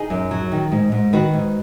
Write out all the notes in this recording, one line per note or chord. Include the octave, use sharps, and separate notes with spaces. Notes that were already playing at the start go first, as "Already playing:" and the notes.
Already playing: D#4 G#4
F#2
F#3
D#3
G#2
G#2
D#3 F#4 B4
G#2